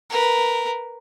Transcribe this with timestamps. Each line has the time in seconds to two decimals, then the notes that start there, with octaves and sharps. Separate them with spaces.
0.10 A#4 B4